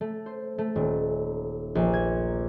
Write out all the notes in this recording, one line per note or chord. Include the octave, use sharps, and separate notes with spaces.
A3
C5
A3
D#1
A#1
G#6